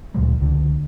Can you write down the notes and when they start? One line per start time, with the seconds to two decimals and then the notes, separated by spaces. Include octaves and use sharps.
0.14 D2 A#2 F#3 G#3
0.39 C#2 D3